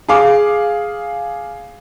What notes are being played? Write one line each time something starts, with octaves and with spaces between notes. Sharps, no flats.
G#4 F5 D6